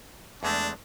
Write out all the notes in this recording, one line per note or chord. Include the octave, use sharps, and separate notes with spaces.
E2 G#3 A3 D4